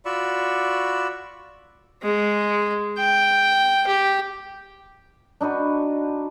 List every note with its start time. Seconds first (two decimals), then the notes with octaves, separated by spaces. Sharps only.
0.05 F4 F#4 D5 B5 C#6 E6
2.03 G#3
2.98 G5
3.87 G4
5.41 D4 D#4 F#4 B4